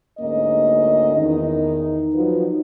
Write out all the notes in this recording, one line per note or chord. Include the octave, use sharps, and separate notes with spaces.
D2 G#2 A#3 C#4 D#5
E2 D#3 D#4
F3 F#3 D#4 F4 F#4 B4